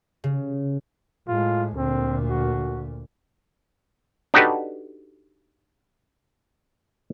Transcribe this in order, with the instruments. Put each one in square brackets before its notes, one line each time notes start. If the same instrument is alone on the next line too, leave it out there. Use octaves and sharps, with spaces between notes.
[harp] C#3
[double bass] A2 G#3 [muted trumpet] F4
[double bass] D2 A#2 [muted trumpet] C4
[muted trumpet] F#4
[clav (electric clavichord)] D4 D#4 F#4 G4 A4 B4